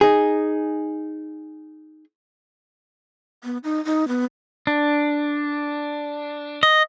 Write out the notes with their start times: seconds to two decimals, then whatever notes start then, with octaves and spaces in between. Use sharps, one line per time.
0.01 D#4 G#4
3.44 B3
3.64 D#4
3.85 D#4
4.08 B3
4.67 D4
6.63 D#5